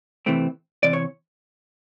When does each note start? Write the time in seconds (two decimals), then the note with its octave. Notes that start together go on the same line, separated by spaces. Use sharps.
0.26 E2 C3 E3 A3 C4
0.83 E2 C3 E3 C4 D5
0.93 C#5